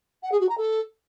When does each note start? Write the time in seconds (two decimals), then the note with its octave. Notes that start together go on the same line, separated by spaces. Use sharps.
0.23 F#5
0.31 G#4
0.40 F#4
0.49 A#5
0.57 A4